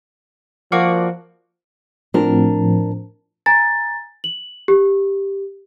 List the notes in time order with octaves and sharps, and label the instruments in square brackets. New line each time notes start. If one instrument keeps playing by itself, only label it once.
[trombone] F3 [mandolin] A#3 F#4 D5
[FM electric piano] A2 F3 C4 [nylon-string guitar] D4 A#4
[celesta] G#5 A#5 A6
F#7
G4